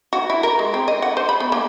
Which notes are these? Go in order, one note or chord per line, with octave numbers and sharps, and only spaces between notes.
F#4
E4
A#4
G#3
C4
D#5
F#5
C5
B5
B3
A#3